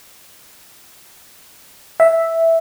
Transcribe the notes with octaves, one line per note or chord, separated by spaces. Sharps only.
E5